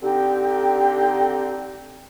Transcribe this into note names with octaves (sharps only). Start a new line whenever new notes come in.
D3 C4 D#4 G4